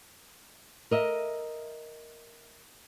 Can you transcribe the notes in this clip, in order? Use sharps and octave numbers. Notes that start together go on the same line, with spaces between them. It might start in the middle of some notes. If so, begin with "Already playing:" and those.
A#4 D#5 E5